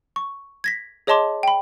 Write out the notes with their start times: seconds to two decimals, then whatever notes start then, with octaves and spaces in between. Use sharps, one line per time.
0.16 C#6
0.64 G#6 A#6 B6
1.07 G#4 C#5 D#5 A5 C6 D6
1.43 G5 B5